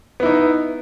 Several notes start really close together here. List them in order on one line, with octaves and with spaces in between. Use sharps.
B3 E4 D#4